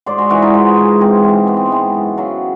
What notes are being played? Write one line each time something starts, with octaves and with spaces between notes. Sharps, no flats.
G#2 C5 D5
F#4 G#4
E3 G#3 E4 F#4
D#4 F4
G#2
E3 G#3
G#2 C4
E3 G#3
G#2 B3
C4
B3
E3 G#3
F#2
C#3 F#3